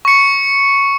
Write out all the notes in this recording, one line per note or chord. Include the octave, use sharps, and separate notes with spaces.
C#6 C#7